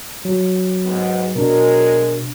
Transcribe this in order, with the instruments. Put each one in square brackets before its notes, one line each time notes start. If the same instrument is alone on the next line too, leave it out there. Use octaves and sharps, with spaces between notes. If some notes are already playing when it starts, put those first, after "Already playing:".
[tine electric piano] F#3
[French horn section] G#2 B3
[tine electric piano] B2 D4 [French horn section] F#3 G#3 A#4